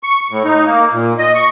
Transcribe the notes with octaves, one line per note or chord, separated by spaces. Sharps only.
C#6
A2
D#4
A#3
A#2
D#5
C#6